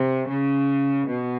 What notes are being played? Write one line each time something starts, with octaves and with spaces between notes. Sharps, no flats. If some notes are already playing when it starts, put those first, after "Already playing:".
Already playing: C3
C#3
B2